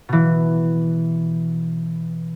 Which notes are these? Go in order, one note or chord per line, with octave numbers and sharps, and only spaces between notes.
B2 E3